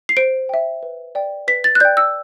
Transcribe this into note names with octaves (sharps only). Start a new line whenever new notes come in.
C7
C5 D7
E5 G5
B4
D5 G5
B4 B6
A6
F#6
D5 G5 G6
E6